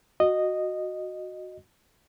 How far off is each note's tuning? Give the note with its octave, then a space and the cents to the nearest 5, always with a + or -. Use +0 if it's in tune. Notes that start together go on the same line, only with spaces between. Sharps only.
F#4 -5 D#5 -10